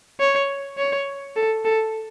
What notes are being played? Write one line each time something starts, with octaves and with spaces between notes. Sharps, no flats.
C#5
C#5
A4
A4